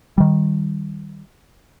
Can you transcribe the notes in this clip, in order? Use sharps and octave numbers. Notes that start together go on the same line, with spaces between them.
D#3 G3